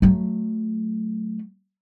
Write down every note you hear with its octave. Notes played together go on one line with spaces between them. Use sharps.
F#3 A3